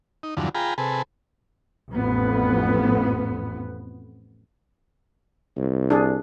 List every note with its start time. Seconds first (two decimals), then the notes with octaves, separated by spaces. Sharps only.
0.23 D#4
0.37 E2 G2 D3 F3 F#3
0.55 F4 G#4 G5 A#5 B5
0.78 C3 G#4 A4 B4
1.91 A1 F2 B3
5.56 C2
5.90 D4 G#4